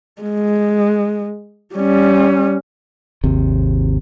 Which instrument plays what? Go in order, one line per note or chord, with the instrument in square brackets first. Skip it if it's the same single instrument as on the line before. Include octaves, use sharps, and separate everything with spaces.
[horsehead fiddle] G#3
G3 C#4
[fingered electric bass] G#1 D#2 C3